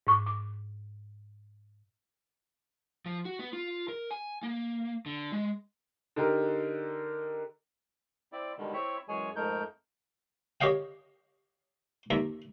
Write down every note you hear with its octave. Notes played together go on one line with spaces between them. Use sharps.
G#2 C#6 D6
D6
F3
F#4
B3
F4
A#4
G#5
A#3
D3
G#3
D3 D#4 G4 A#4
C4 E4 D5
B2 D3 D#3 G3 G#3
C4 E4 C#5 E5
F#2 E3 G#3 G#4 C#5 G#5
F2 G#2 A3 D#4 A#4 G6
G4 C#5 D#5 F5 G5
D#2 E5 A#5